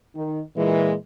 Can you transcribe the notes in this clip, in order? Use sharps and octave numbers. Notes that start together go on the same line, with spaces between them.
D#3
A#2 E3 G#3